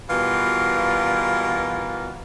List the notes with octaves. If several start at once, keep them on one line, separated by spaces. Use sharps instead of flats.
B2 E3 G3 F4 F#4 A#4